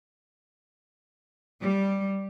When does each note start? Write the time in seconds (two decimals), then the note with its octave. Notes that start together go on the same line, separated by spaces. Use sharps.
1.62 G3